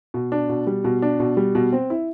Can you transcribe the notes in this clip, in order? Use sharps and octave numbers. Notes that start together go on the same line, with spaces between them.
B2
D4
B2
G3
B2
D4
B2
G3
B2
C4
E4